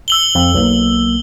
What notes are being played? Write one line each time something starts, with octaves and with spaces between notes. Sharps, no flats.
E6 F#7 G7
F2
B1 A#3